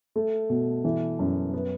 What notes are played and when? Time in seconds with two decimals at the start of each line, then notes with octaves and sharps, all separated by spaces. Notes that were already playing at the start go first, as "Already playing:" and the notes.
0.16 A3
0.50 B2
0.85 E3
1.19 F#2
1.53 B3